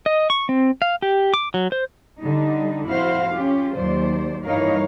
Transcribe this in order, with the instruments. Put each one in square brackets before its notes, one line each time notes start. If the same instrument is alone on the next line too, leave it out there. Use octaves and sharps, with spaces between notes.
[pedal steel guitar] D#5
C#6
C4
F5
G4
D6
F#3
C5
[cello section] D3 G3 D#4
F2 E4 F#4 C5 F5
C#4 F4 G4
D#2 F#3 C5 D5
G2 E3 D#4 A#4 C#5 F5